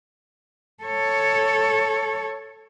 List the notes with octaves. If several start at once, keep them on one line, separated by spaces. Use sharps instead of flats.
A4 C#5